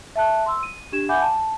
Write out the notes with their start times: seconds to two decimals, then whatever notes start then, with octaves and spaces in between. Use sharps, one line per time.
0.16 E5 A5 F#6
0.46 C6 E6
0.63 D#7
0.92 D4 G4 G#6 E7
1.09 E5 F#5 G#5 B5 D6 G6
1.21 A5